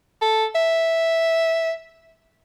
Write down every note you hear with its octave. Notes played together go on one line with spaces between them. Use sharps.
A4
E5